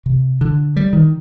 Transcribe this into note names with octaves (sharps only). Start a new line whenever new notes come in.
C3
D3
G3
D#3